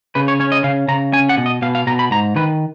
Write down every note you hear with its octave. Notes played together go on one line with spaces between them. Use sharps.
C#3 B4
C#5
C#4 C#5
D#5
C#3 F5
C#3 A#5
C#4 G#5
F#5
B2
D#5
B2 F5
F5
B2 A#5
B5
G#2 A#5
D#3 B4